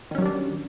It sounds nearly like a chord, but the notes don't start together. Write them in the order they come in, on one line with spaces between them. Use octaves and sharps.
D#3 C#4 F#3 G3 D4